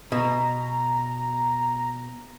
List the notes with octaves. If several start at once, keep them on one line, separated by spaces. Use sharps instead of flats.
B2 A#5